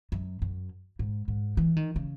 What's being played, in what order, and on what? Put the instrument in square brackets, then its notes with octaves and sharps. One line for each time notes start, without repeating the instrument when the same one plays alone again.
[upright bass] F#2
F#2
G#2
G#2
E3
D#3
C#3